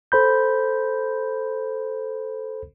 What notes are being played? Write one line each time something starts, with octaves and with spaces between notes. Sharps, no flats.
A4 C5 B5 G6